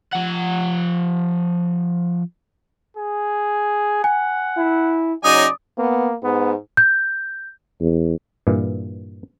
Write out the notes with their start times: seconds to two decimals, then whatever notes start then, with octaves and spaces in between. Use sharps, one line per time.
0.13 F3 F#5
2.97 G#4
4.04 F#5 G#5
4.57 E4
5.24 C#3 F#3 D#4 D5 G#5 D#6
5.78 A#3 B3
6.23 G#2 B3
6.77 G6
7.81 E2
8.47 G2 A#2 E3